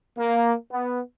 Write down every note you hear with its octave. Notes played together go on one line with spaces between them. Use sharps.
A#3
B3